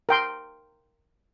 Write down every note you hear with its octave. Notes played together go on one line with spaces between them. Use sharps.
A#4 G5 C6